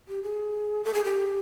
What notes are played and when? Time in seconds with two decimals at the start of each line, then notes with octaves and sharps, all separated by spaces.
0.08 G4
0.23 G#4
0.84 A4
0.94 G#4
1.04 G4